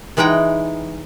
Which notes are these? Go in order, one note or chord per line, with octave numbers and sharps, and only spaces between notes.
E3 G#3 D#4 F#5 G5